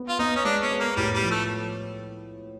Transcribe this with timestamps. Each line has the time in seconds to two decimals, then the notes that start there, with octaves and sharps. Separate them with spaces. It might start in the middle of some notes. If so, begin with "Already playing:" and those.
Already playing: B3
0.09 F4
0.19 B3 D#4
0.36 C#4
0.45 G#3 D4
0.62 C#4
0.71 B3
0.80 A#3
0.96 A2 G3
1.15 G3
1.23 F3
1.31 A3